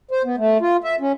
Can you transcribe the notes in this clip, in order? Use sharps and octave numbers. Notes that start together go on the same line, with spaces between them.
C5
B3
A3
F4
E5
C#4